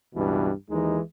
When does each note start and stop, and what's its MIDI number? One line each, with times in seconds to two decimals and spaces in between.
0.15 0.51 37
0.15 0.51 43
0.15 0.51 47
0.15 0.51 52
0.70 0.99 39
0.70 0.99 52
0.70 0.99 56
0.70 0.99 63